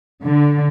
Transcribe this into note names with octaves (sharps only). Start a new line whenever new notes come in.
D3